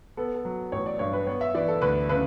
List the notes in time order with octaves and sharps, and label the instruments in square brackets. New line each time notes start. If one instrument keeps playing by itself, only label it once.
[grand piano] B3 A4
A4
F#3
A1 C#5
D5
G2 C#5
B4
B3 C#5
E5
E3 D5
A4
D2 B4
C#3 B4